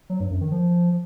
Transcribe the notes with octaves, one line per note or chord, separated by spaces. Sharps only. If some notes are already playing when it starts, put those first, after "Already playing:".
F#3
G2
F#2
D#3
F3